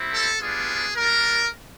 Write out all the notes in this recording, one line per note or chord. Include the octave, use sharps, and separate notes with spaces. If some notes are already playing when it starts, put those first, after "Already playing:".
Already playing: G3 C4 E4
A4
G3 B3 D4 F4 G#4
G3 A#3 D4 A#4